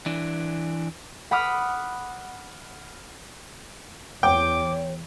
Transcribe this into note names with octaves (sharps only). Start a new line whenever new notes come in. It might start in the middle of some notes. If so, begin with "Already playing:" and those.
E3 D4
F#5 B5 D6 D#6 F6
E2 C#5 G5 D6